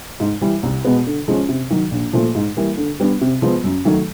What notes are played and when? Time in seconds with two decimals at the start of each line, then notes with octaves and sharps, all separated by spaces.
0.20 G#2
0.41 E3 G3
0.63 C2
0.85 B2 G#3 B3
1.07 D3
1.28 F3 G#3 C#4
1.49 C3
1.70 D#3 F#3
1.91 A#1
2.13 A#2 F3 A3
2.35 G#2
2.56 E3 G3 A#3
2.77 D3
3.00 G3 B3 D4
3.21 C3
3.42 F3 G#3 B3
3.64 F#2
3.85 D#3 F#3 A3